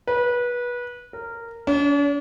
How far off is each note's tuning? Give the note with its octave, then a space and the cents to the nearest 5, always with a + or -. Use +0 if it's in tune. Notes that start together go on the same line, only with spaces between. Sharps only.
B4 -25
A#4 -15
D4 -45